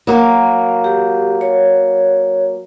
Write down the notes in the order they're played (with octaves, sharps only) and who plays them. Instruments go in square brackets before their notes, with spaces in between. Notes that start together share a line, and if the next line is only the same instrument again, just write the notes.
[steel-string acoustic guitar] F#3 A#3
[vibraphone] G4
C#5